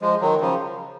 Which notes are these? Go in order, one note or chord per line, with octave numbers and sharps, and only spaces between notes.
F3 G#3
D#3 F#3
C#3 F3